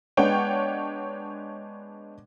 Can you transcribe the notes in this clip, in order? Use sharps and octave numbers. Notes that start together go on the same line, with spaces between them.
G#3 B3 D4 C#5 F#5 G5